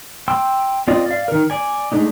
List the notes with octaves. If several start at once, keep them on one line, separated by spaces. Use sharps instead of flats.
G5 C6 E6
C4 F4 D5 D#5
D5 F5
D#3 A#4
D5 G#5
G#3 A3 D4 D#4